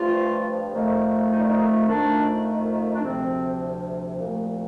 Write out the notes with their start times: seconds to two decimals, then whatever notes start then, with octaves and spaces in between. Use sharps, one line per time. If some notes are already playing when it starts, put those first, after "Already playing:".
Already playing: G2 F3 A3 F4
0.73 F2 D#3 A3
1.31 D#4
1.39 D4
1.47 D#4
1.87 F2 D#3 A3 D4
2.92 D4
3.02 D2 C3 F3 C4
4.18 C2 A#2 F3 A3